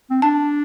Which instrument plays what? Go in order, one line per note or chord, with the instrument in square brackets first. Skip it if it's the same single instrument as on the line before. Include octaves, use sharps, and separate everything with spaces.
[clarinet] C4
[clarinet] D4 [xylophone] A5